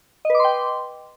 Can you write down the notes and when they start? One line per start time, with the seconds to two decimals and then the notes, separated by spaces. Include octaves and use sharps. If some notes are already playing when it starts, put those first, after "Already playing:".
0.25 D#5
0.30 B4
0.35 D6
0.40 C6
0.44 G5